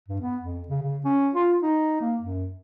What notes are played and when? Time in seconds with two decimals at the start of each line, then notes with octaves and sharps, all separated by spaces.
0.09 G2
0.22 B3
0.42 F2
0.68 C#3
0.83 C#3
1.05 C#4
1.35 F4
1.63 D#4
2.01 A#3
2.21 F#2